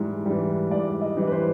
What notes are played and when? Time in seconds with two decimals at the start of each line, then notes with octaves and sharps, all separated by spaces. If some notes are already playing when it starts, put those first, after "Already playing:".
Already playing: G#2 E3 G3
0.26 E3 G3
0.71 G#2 D5
1.02 D#5
1.17 E3 G3
1.27 B4
1.32 C5